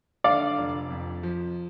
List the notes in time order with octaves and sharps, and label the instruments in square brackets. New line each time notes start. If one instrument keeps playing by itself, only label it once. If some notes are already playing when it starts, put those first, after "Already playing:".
[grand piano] D3 [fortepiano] D5 F5
[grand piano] F1
F2
F3